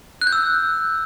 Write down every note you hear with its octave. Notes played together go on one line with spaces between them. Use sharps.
F#6
G6
E6